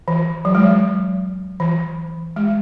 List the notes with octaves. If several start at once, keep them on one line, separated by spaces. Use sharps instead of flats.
E3
F#3
G#3
F#3
E3
G#3